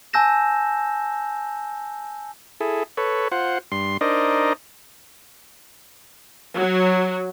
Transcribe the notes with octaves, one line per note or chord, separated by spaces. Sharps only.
G#5 A5 E6 G6 A#6 E7
E4 G#4 A4
A4 B4 C#5
F4 C5 F#5
G2 C6
D4 D#4 A#4 C5 D5 D#5
F#3